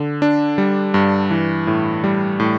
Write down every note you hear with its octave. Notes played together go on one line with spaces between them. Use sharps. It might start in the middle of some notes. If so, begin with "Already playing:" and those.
Already playing: D3
D4
G3
G2
E3
A2
G3
A2